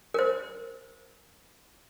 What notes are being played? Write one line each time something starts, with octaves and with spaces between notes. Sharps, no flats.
A#4 C5